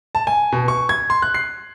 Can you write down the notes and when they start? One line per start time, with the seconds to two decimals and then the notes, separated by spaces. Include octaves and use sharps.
0.15 A5
0.27 G#5
0.53 B2
0.68 C#6
0.89 G#6
1.10 C6
1.22 F#6
1.34 C7